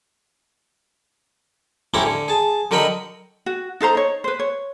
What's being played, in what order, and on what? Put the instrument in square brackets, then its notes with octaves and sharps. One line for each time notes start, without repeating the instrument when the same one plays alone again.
[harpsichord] A2 C#4 E4 G4 C5 A#5
D3
G#4 A5
D3 F#3 A#4 D#5 G5 B5
[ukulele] F#4
D#4 A4 C5 A#5
D#4 C#5
B4 C5
C#5